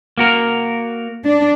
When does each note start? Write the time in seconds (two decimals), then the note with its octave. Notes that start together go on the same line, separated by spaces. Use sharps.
0.18 A#3 F#4 A#4
1.25 D4